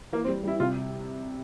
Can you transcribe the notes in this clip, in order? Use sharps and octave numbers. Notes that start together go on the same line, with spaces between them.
E3 A#3
C4
G3
G3 E4
C3 F4